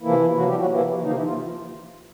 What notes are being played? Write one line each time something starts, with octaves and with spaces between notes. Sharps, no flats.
C3 E3 F3 A#3 E4
C3 F3 F#3 A#3 F#4
G3 G4
F#3 F#4
C3 E3 F3 A#3 E4
C3 D#3 F3 A#3 D#4
E3 E4
F3 F4